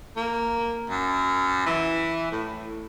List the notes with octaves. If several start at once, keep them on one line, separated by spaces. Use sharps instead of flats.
A#3
F#2
E3
A2